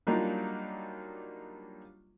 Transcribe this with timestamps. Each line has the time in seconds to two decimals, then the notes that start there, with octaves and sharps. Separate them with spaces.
0.07 F#3 G3 A#3 D4 D#4 F4